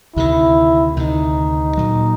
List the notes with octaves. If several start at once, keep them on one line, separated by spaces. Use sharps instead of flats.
D2 C3 D#3 E4
D2 C3 D#3 D#4
A#2 F#3 A#3